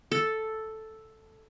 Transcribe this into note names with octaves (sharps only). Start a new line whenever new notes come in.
A4